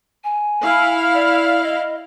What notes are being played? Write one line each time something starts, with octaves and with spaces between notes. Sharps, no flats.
G#5
E4 F5
D5
D#5